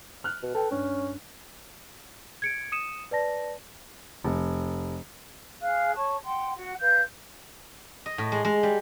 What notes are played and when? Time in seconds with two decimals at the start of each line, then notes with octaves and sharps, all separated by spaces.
0.24 F6 F#6
0.42 B2
0.54 A4 B4 G5
0.71 G2 C#4
2.42 G#6 C#7 D7
2.72 D#6 C#7 D#7 E7
3.11 B4 D5 A5 A#6
4.24 F1
5.62 G#4 F5 F6 F#6
5.96 C#5 A5 C#6
6.24 F#5 G5 C6
6.56 F#4 F#5
6.80 B4 F5 G6
8.06 D#5
8.18 A2
8.32 G#3
8.45 G#3
8.63 G3